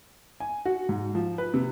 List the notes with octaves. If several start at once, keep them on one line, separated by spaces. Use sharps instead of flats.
G#5
F#4
G#2
F3
B4
C3